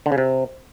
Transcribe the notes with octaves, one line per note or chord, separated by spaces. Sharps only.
D3
C#3
C3